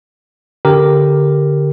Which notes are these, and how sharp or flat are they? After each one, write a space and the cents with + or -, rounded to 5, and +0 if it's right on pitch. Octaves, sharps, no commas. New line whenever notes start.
D3 -10 G4 +0 A#4 +0